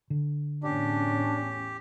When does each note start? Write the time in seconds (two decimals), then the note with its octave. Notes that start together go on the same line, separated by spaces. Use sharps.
0.10 D3
0.64 E2 A2 C#4 D4 G4